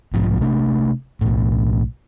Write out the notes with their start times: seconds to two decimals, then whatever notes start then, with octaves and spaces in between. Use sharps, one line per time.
0.13 B1 G#2 F3
0.41 C3 A3 D4
1.21 B1 A2